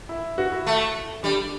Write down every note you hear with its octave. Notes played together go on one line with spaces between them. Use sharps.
E4
F#4
E4
A3
G3 D4